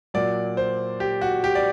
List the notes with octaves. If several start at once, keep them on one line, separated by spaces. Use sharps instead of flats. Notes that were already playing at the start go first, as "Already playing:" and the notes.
A#2 F#3 D5
C5
G4
F#4
G4
D5